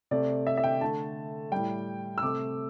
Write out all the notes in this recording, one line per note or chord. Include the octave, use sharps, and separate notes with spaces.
C3 A3 D5
E5
E5
G5
D3 A3 A5
A2 G3 G5
E6
C3 A3 D6